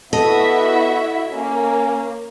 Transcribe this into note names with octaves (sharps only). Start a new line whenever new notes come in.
B3 E4 F#4 A4 D#5 E5
A#3 C#4